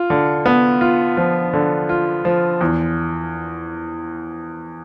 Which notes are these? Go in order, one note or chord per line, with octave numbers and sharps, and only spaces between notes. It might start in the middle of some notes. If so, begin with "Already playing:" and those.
Already playing: F4
D3
B3
F4
F3
D3
F4
F3
E2